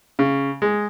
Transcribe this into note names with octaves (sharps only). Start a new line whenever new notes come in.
C#3
G#3